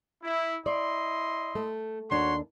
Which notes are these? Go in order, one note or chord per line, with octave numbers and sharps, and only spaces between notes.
E4
E4 D5 D#5 C6
A3
D#2 D4 F#4 C#5 C6